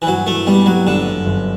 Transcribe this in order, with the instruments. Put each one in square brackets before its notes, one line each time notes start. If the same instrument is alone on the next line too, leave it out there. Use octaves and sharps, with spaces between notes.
[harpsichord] E3
[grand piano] G2 [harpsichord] F#3
[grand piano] E3 [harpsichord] A3
[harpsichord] G3 [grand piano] B3
[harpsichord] F#3 [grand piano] G3
[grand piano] G1 [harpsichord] D3
[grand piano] F#2
G1